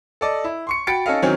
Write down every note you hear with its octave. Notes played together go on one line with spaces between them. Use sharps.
A4 D5 D#5
E4
C6 C#6 C#7
F#4 G5 B5 A6 C#7 D7
C#4 D#4 A4 D#5 F5
D#3 E3 F#3 C4 C#4